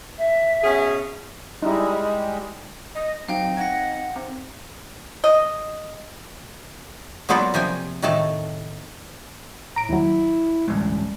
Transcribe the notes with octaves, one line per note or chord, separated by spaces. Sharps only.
E5
B2 C#4 G#4
G3 G#3 D#4 E4
D#5
F#3 C4 D#4 F5 G5
D#4 F#5 G#6 A#6
C4
D#5
F#3 A#3 B3 F4 A4 D5
C3 F3 G5 G#5
A2 D#3 A3 A4 A5
A2 A#5 D7
D#2 F#3 E4
A1 D2 G3 G#3